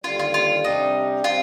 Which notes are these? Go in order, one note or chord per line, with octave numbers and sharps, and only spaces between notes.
D#2 D3 G3 F4
F4
F4
C3 G3 D4 D#4 G4
C3 G3 C4 F4